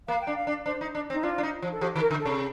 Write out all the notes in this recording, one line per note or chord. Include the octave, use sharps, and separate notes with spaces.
A#3 F5
G5
D4
F5
D4
D4 C5
D#4
D4
C4
D#4
D4 F4
D4
D#4
F3
A4
F3 G4
D#3
A#4
D3
A4
C3